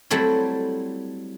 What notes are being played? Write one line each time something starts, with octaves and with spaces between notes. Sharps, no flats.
F#3 G3 A3 C4 E4